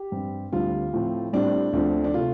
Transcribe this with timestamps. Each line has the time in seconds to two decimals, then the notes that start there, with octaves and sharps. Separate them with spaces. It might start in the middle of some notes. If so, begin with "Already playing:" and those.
Already playing: G4
0.12 G2 G3 C4
0.52 D2 D3 G3 C4 F4
0.93 A2 F3 C4
1.33 A2 G3 C4 D4
1.73 D2 D3 F3 C4
2.04 D4
2.14 C3 A3 F4